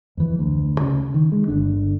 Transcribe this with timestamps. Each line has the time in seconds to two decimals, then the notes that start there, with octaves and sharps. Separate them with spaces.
0.17 F2 E3
0.39 D2
0.80 C#3
1.14 D#3
1.32 G#3
1.48 G1 D3 D4